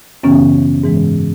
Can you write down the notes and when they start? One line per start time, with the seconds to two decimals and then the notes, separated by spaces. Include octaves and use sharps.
0.23 F#2 C#3 E3 B3 C#4
0.83 G#2 E3 G#3